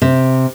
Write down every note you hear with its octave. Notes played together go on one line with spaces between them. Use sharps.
C3